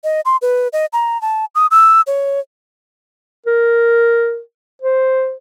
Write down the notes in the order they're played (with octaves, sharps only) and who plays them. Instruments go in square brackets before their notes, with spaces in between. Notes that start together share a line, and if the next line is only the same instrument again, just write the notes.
[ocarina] D#5
C6
B4
D#5
A#5
A5
D#6
E6
C#5
[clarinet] A#4
C5